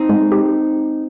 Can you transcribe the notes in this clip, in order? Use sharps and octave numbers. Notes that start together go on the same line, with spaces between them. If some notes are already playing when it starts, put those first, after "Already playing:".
Already playing: C4 D#4
G#3
G4